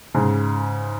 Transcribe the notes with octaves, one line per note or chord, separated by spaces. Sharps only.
G#2 C#3